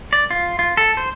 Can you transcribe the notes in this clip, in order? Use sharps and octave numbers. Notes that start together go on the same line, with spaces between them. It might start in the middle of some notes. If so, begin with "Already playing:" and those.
D5
F4
F4
A4
C5